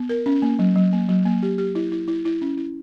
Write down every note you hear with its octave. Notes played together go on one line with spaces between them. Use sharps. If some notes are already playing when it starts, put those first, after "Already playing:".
Already playing: B3
A#4
C#4
A#3
F#3
F#3
A#3
F#3
A#3
G4
G4
E4
E4
E4
E4
C#4
E4